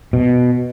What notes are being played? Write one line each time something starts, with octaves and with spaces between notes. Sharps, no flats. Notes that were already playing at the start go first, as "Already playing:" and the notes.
B2